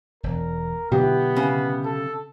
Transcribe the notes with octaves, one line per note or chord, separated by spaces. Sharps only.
E1 A#4
B2 D3 F#3 B3 E4 G4
C#3
A4